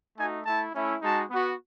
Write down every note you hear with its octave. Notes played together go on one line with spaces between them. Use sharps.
A3 D#4 F#4 G#5
A3 E4 A5
A3 C#4 E4
G#3 D#4 F#4 A5
B3 F#4